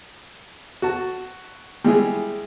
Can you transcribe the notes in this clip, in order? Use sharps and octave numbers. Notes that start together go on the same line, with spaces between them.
F#4 A5
G3 G#3 E4 G#4